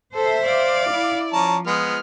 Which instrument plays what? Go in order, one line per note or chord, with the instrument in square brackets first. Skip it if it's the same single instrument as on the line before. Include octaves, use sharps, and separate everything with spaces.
[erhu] A4 [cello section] C5 E5
[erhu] D5 [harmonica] F5
[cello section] E4
[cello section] F3 [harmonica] C#4 A5 A#5
[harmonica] G#3 B3 [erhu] F6